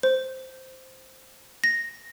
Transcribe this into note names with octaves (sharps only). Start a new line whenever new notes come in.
C5
A#6